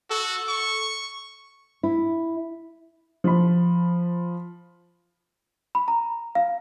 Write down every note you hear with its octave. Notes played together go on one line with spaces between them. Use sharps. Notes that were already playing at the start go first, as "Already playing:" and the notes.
F#4 A4
C#6
E4
F3 B5
B5
A#5
F5